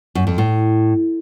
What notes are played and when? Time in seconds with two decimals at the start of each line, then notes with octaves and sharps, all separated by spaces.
0.15 F#2
0.27 F2
0.38 A2